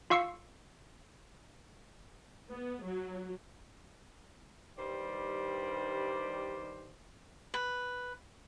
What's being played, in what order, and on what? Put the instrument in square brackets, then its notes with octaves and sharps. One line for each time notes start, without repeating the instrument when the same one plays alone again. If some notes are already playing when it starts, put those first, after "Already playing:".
[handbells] F4 F5 C#6 E6 C7 C#7
[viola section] B3
F#3
[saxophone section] G2 D#3 G3 C5 D5
[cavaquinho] B4